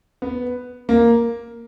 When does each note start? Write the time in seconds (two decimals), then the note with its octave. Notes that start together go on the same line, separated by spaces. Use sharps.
0.22 B3
0.89 A#3